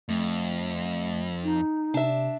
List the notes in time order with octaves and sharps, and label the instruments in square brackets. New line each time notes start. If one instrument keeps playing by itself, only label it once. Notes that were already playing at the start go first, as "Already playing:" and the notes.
[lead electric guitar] F2 [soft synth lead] A3
[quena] D#4
[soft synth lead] C3 [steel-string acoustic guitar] D4 E5